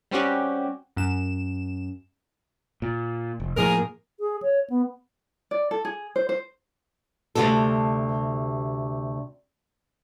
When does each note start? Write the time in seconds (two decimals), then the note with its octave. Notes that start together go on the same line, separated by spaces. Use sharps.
0.11 G3 C4 C#4 F#4 G4
0.97 F#2 E7
2.82 A#2
3.40 F1
3.57 A2 F3 A#3 G#4 A#4
4.20 G#4
4.42 C#5
4.70 B3
5.51 D5
5.71 A4
5.85 G#4
6.16 C5
6.29 C5
7.35 D2 G2 C3 G3 A4